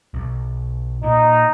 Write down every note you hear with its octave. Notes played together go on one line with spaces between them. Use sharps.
B1
A#2 D#4